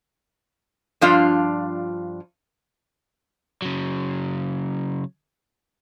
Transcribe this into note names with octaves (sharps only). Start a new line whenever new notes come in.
G2 F3 D4 F4 F5
C#3 F#3